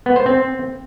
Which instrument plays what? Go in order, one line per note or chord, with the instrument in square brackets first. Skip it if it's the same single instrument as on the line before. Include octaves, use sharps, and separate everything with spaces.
[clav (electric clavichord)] B3
C5
C4